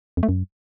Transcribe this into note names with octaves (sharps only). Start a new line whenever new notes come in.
F2
A3
F#2